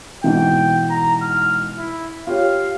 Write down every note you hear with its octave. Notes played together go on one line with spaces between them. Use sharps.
G#2 B2 E3 G5
A#5
F6
E4
F4 G4 C#5 F5